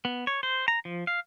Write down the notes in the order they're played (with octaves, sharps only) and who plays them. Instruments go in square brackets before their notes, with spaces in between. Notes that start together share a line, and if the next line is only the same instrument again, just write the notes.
[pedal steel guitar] B3
C#5
C5
A#5
F3
F5